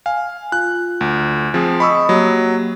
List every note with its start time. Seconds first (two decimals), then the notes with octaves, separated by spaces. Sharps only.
0.06 F5 G#5
0.52 F4 F#6
1.01 D2
1.54 F3 C4 G#4
1.80 D#5 B5 C#6 D#6 E6
2.09 F#3 A#3 G4